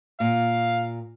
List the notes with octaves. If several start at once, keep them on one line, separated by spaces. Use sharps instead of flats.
A#2 F5